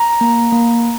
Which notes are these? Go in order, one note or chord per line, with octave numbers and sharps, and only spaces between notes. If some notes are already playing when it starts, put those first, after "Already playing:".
Already playing: A#5
A#3
A#3